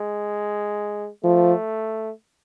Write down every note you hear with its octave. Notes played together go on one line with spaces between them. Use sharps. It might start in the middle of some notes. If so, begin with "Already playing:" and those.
Already playing: G#3
F3 A3